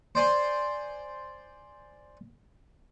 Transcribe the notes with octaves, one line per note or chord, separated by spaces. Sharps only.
C5 D5 G#5 C6